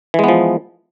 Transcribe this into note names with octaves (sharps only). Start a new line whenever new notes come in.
E3 F3 G#3 B3